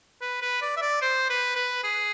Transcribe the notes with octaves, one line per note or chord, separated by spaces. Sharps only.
B4
B4
D5
E5
D5
C5
B4
B4
G#4